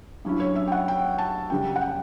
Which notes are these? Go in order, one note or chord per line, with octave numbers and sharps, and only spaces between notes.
G2 F#3 C#4 E4
C#5
E5
G5
F#5
G5
A5
F#2 C#3 G3 G5
F#5
G5